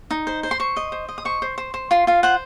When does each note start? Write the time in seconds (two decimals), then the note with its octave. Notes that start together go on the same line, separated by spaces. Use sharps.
0.11 D#4
0.27 C5
0.43 C5
0.51 C6
0.60 C5 C#6
0.77 D#5
0.92 C5
1.09 D#5
1.18 D#6
1.25 C5 C#6
1.42 C5
1.58 C5
1.74 C5
1.91 F4 C6
2.07 F4 F5
2.23 C5 F#5